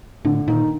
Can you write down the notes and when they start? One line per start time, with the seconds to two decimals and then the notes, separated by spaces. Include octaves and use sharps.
0.25 A2 D3
0.48 A#2 D#3